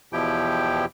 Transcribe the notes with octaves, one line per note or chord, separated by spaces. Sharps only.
E2 B2 F3 E4 G4 G5